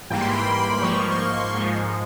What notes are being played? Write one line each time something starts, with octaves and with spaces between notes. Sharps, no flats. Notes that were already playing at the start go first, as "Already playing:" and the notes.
G#2 E3 G3 A#3 G5
C6
B5
B5
C6
G#2 F3 A#3 C#6
C#6
C6
C#6
C#6
G#2 F3 G#3